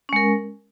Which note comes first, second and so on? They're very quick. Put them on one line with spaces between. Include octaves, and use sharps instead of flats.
C#4 G#3 A#4